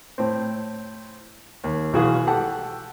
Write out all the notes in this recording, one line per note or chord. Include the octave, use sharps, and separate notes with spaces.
A2 C4
D#2
B1 E3 F#4 G#4 F5
G4 A4 F#5